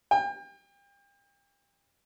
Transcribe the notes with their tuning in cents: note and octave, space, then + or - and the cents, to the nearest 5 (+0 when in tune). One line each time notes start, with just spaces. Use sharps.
G5 +35